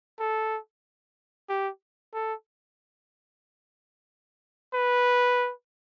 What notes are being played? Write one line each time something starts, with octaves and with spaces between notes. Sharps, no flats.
A4
G4
A4
B4